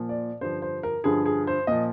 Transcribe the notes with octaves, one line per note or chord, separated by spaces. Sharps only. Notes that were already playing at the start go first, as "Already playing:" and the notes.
Already playing: A#2 F3
D5
G2 D3 F3 C5
C5
A#4
G2 D3 F3 G#4
G#4
C5
A#2 F3 D#5